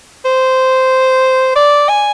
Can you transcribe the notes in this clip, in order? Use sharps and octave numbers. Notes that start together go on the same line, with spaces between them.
C5
D5
G#5